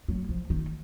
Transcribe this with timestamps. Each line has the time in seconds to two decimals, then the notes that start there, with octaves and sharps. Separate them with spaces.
0.08 F#3
0.29 F3
0.50 D#3